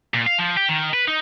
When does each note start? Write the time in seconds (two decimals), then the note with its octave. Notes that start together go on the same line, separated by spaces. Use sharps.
0.14 A#2
0.26 F5
0.38 F3
0.57 G4
0.69 D#3
0.94 B4
1.08 D#4